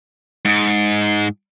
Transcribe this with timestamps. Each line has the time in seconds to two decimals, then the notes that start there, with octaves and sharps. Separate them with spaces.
0.45 G#2